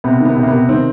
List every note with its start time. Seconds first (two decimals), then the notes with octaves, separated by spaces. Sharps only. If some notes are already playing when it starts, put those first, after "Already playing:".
0.04 C3 B3
0.20 D#3
0.25 B3
0.36 C3
0.43 A#3
0.47 C3 B3
0.69 D#3 C4